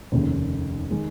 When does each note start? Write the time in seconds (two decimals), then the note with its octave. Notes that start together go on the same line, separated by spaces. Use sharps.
0.12 F1 D#2 C#3
0.91 D#3 G#3